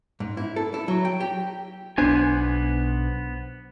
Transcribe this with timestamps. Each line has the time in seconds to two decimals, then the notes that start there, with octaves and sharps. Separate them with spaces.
0.20 G#2
0.37 E4
0.56 A4
0.74 E4
0.88 F#3
1.05 G5
1.20 G4
1.98 B1 B3 D4 C5 G#5